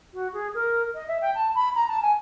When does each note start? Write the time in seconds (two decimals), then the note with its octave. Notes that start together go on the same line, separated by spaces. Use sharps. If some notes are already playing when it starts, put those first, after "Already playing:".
0.14 F#4
0.33 G#4
0.54 A#4
0.95 D#5
1.08 E5
1.21 G5
1.35 A5
1.55 B5
1.75 A#5
1.88 A5
2.02 G#5